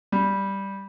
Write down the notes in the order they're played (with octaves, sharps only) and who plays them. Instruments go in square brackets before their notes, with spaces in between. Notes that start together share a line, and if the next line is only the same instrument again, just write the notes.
[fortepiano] G3